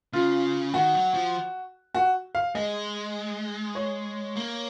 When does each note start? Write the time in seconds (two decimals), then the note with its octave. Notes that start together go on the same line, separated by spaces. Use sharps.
0.13 C#3 F4
0.74 D#3 F#4
0.94 F#3
1.14 F3
1.94 F#4
2.35 F5
2.55 G#3 D#5
3.75 C#5
4.36 A#3